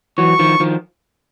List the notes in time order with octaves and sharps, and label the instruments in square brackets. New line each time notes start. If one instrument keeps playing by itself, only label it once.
[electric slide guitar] E3 F#3 [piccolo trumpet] C#6
[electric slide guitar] D#3 F3
D#3 F3